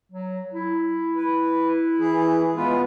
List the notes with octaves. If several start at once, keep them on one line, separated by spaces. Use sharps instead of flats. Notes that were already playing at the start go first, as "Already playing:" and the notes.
F#3
E4
B4
E3 G#4
G#3 B3 F4 B4